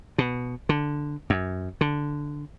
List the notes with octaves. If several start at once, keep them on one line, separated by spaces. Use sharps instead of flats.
B2
D3
F#2
D3